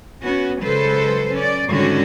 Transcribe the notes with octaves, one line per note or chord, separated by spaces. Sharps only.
B3 C#4 F#4
C#3 F#3 G#3 A4 B4 C5
C#4 D5
G#2 D3 D#3 G3 C#4 F#4